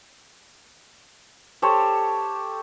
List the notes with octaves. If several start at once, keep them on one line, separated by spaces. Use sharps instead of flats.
G4 A4 C5 C#5